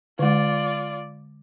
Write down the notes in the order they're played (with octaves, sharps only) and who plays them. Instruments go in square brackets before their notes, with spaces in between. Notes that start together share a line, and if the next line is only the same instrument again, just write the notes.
[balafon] D3 G#3 [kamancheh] F4 D5